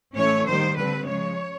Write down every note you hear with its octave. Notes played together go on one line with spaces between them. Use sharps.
A2 E3 A3 C#4 C#5
D#3 G3 A#3 C5
D3 G3 C4 B4
C#3 F3 G#3 C#5